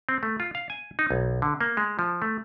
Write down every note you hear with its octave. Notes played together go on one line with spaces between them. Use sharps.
C4
A3
F4
F5
G#5
D#4
B1
D3
A#3
G#3
F3
A3